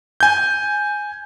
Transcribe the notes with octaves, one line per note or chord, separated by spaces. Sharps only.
G#5 G6